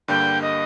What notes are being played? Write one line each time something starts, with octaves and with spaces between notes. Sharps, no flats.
G2 D3 G3 A#3 G5
D#5